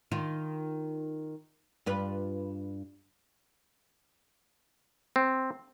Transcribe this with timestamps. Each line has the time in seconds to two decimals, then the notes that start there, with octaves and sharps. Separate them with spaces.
0.11 D#3 F4
1.86 G2 F4 B4
5.16 C4